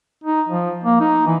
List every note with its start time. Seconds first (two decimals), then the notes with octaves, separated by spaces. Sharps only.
0.24 D#4
0.49 F3
0.84 A#3
1.00 D#4
1.27 E3